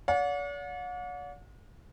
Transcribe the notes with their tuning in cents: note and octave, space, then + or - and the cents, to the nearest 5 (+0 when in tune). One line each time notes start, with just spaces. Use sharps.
D5 -45 F#5 -45